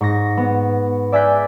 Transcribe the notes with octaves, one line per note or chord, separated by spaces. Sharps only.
G#2 C#6 A#6
B3
D5 E5 G#5 F#6 G6 B6